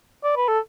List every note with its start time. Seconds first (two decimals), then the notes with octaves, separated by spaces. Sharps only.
0.24 D5
0.37 B4
0.48 A4